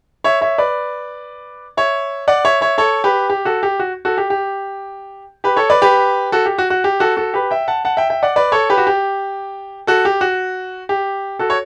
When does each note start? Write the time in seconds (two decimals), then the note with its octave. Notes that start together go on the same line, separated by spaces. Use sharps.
0.24 C#5 E5
0.41 C#5 E5
0.58 B4 D5
1.77 C#5 E5
2.28 D5 F#5
2.45 C#5 E5
2.61 C#5 E5
2.78 A4 C#5
3.04 G4 B4
3.30 G4
3.45 F#4 A4
3.63 G4
3.80 F#4
4.05 F#4 A4
4.18 G4
4.30 G4
5.44 G4 B4
5.57 A4 C#5
5.70 B4 D5
5.82 G4 B4
6.32 F#4 A4
6.46 G4
6.58 F#4
6.70 F#4
6.84 G4
7.00 F#4 A4
7.17 F#4 A4
7.34 G4 B4
7.51 E5 G5
7.68 F#5 A5
7.85 F#5 A5
7.97 E5 G5
8.10 E5 G5
8.23 D5 F#5
8.36 B4 D5
8.52 A4 C#5
8.70 G4 B4
8.78 F#4
8.87 G4
9.87 F#4 A4
10.05 G4
10.21 F#4
10.89 G4
11.39 F#4 A4
11.50 C#5